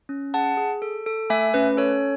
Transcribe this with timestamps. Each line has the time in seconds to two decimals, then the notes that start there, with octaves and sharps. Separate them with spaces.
0.09 C#4
0.34 G#4 F#5 A5
0.57 G#4
0.82 A4
1.06 A4
1.30 A3 E5 G#5
1.54 C#4 B4
1.77 A4 C#5